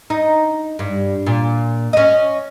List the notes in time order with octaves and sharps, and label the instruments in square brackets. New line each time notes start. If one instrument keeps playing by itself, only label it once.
[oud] D#4
G2
A#2
C#4 D#5